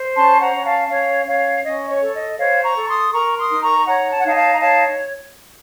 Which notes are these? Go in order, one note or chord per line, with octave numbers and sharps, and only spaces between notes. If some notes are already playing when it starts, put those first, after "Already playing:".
Already playing: C5
C#4 A5 C6
F#5 A#5
C#4
F5 A5
C#4 C#5 F5
C#4 C#5 F5
C#4 D#5
C#5
A4
D#5
C5 C#5 F5
A#5 C#6
A4
C6 D#6
A#4 A#5 C#6
C6 D#6
D#4
A#5 C#6
C#5 F#5 A#5
A5
F#5
D#4 F5 A5
F5 A5
A#5
C#5 F5 A5